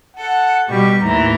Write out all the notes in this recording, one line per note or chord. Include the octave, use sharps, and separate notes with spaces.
A4 F#5
B2 G3 G4 C#6
D#2 A2 E3 A#5